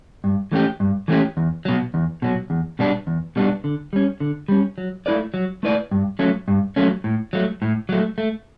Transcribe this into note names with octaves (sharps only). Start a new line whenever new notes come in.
G2
E3 A3 C#4 G4
G2
E3 A3 C#4 G4
E2
B2 F#3
E2
B2 F#3
E2
B2 G3 B3 D4
E2
B2 G3 B3 D4
D3
G3 C#4
D3
G3 C#4
F#3
A3 E4 B4 D5
F#3
A3 E4 B4 D5
G2
F#3 A3 C#4
G2
F#3 A3 C#4
A2
F#3 A3
A2
F#3 A3
A3